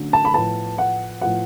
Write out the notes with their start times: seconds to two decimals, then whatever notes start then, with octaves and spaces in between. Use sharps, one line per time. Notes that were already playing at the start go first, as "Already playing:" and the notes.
Already playing: D3 F#3 A3 C#4
0.13 A5
0.25 B5
0.34 A2 F3 B3 A5
0.78 F#5
1.21 A2 F3 B3 F#5